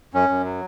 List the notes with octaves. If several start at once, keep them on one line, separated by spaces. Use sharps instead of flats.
F#2 C#4
F#2
F#3